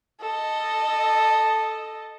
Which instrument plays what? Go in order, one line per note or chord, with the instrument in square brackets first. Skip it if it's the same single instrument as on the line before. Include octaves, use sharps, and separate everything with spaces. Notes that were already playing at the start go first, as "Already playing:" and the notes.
[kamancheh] A4 D#5